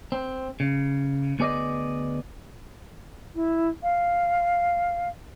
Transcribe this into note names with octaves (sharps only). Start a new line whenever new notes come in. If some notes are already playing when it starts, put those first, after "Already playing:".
C4
C#3
D2 B3 G#4 D5 D#5
E4
F5